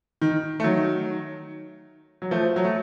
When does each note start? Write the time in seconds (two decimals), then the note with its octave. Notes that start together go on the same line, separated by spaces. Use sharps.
0.21 D#3
0.60 A3
0.64 D#3 F#3
2.22 F#3
2.31 F3 A3
2.56 F#3
2.65 A3